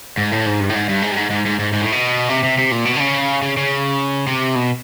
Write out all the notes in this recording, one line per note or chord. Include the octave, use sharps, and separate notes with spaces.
G#2
A2
G#2
G2
A2
G#2
G2
G#2
G2
G#2
G#2
G#2
G#2
G#2
A2
B2
C3
C3
C3
A#2
B2
D3
C#3
C#3
C#3
C3
B2